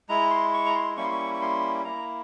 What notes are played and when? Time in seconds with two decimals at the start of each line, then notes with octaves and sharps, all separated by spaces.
0.09 G#3 E4 A#5
0.31 C6
0.54 C#6
0.66 A#5
0.75 C6
0.97 G3 A#3 C#4 E4 C#6
1.04 C6
1.11 C#6
1.34 C#6
1.42 C6
1.84 A#3 E4 A#5